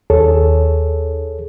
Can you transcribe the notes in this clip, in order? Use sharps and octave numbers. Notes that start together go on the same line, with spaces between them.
D#2 G#4 A4 C#5